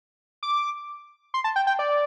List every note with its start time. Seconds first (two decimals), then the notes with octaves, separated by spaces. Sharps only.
0.43 D6
1.34 C6
1.44 A5
1.56 G5
1.67 G5
1.79 D5